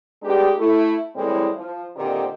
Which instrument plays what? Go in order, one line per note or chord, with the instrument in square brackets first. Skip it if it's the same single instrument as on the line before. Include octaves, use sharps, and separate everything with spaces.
[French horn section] G#3 B3 D4 D#4 G4
A3 E4
A2 E3 G3 G#3 C4 E4
F3
A#2 D3 D#3 C4 D#4 G4